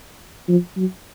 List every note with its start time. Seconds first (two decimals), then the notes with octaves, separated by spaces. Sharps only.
0.48 F3
0.77 F#3